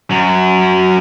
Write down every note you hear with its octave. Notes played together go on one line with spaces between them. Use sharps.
F#2 F#3